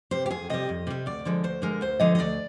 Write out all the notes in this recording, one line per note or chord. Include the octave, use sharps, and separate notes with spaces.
C3 G3 C5
G4
F2 G#4
C3 G3 D#5
F2
C3 G3
D2 D5
D3 F3 G#3
D2 C5
D3 F3 G#3 A#4
D2 C5
D3 F3 G#3 D#5
D#5
D2 D5